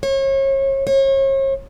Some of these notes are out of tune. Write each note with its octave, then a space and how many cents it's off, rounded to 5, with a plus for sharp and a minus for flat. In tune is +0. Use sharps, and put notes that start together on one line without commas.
C#5 -35
C#5 -40